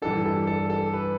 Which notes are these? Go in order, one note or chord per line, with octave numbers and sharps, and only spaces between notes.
G2 E3 G3 D4 A4
A4
A4
A4
B4